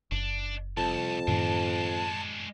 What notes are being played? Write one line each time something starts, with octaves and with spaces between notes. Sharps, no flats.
F#1 D4
C2 F2 A5
F#2 A2 D#3 G#3 D4